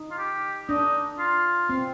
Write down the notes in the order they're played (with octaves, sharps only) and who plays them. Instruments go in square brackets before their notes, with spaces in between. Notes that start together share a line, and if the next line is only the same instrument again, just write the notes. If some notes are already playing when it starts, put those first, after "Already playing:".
Already playing: [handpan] D#4
[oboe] F4
G4
[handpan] D4 [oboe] D#4
[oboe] F4
[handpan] C4